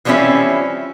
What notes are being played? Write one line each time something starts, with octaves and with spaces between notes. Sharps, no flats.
E3 F3 G3 C4 C#4 E4